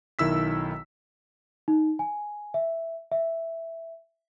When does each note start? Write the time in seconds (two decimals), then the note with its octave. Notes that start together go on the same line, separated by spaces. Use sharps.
0.19 B1 D#3 E4 E6 B6
1.68 D#4
1.99 G#5
2.54 E5
3.12 E5